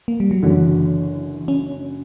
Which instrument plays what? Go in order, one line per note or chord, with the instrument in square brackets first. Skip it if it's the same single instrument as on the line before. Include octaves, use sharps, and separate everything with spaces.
[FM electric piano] A#3
G3
F#3
[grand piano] F#1 F#2 D3 [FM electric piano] E3
[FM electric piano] C#4